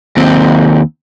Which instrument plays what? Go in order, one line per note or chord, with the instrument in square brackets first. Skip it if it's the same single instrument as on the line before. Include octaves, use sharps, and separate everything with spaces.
[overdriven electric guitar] D#2 C4